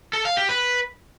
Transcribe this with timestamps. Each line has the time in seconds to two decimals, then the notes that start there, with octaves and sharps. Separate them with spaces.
0.13 A4
0.25 F5
0.37 G4
0.49 B4